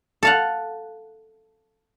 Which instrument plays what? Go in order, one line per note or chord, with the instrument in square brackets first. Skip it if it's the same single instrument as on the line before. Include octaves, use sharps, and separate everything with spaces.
[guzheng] A4 F5 F#5